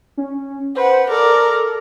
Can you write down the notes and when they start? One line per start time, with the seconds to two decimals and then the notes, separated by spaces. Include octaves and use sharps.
0.17 C#4
0.76 B4 C5 F#5
1.11 A4 A#4 D5